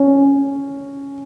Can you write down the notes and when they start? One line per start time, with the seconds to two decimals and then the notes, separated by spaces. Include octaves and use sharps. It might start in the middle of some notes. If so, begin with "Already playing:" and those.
Already playing: C#4